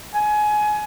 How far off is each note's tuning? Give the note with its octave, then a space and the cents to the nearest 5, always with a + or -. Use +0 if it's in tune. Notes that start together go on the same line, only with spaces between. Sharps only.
G#5 +25